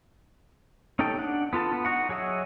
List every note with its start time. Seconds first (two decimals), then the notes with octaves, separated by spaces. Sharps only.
0.99 C#4 D#4 G4 A4 G5
1.19 D4 F#5
1.53 B3 F4 A4 A5
1.73 B3
1.85 D#4 F#4 F#5
2.09 F#3 G#4 C#5 D#5 E5